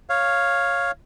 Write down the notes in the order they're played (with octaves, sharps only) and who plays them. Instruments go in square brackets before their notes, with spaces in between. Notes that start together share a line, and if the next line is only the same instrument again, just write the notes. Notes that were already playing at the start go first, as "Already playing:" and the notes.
[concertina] C#5 F5